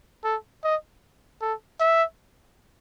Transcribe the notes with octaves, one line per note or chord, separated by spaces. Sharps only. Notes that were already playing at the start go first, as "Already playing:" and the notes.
A4
D#5
A4
E5